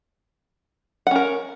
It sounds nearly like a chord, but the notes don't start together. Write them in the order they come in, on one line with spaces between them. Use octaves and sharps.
F#5 C#4 A#4